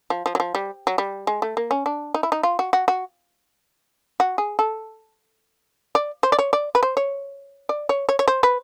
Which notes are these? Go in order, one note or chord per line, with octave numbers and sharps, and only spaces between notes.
F3
F3
F#3
F3
G3
F#3
G3
G#3
A3
A#3
C#4
D4
D#4
E4
D#4
F4
F#4
F#4
F#4
F#4
G#4
A4
D5
C5
D5
C#5
D5
B4
C5
C#5
D5
C#5
C#5
C#5
C5
B4